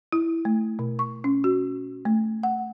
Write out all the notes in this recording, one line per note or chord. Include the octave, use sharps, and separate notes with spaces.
E4
A3
B2
C#6
C#4
F#4
A3
F#5